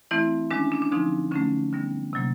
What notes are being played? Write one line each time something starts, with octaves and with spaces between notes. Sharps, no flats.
E3 A3 C4 E4
D#3 G#3 C#4 D4
D4
D4
D3 F3 G#3 C4 D#4
D3 F#3 A3 C#4
D3 G3 B3
C3 D#3 F#3 A#3